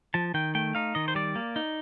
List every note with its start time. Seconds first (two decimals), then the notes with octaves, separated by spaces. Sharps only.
0.14 F3 A5
0.34 D#3 G5
0.55 A3 G5
0.75 D#4 F5
0.95 D#3 D#5
1.08 C5
1.15 G3 D5
1.36 A#3
1.56 D#4